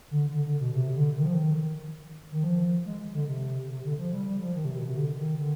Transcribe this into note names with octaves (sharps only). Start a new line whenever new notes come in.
D3
D3
D3
B2
C3
D3
D#3
F3
D#3
D#3
F3
G#3
D3
C3
C3
D3
F3
G3
G3
F3
D#3
C3
B2
C3
D3
D#3
D3